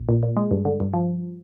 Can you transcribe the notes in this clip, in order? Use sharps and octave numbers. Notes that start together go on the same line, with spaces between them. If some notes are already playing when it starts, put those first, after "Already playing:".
Already playing: A#1
A#2
A#2
G#3
G2
D3
G2
F3